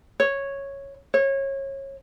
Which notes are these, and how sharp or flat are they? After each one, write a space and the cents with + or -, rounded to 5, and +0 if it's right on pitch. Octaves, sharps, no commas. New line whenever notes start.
C#5 -5
C#5 -25